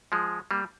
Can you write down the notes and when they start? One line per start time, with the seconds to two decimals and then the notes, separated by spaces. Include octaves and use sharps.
0.12 F3 G#3
0.51 G3 A#3